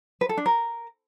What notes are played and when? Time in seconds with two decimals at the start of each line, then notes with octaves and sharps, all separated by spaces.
0.21 B4
0.29 A4
0.37 D4
0.46 A#4